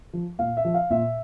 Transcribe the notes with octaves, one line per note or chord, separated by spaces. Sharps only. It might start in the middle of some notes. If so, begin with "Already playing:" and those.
F3
A#2 F5
E5
F3
F5
A#2 E5